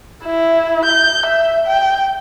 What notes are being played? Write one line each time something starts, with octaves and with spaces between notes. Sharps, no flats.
E4
G6
E5
G5